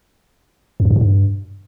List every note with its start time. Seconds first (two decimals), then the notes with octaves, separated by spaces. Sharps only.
0.80 F2
0.85 F#2
0.90 G2
0.96 A#2
1.01 G2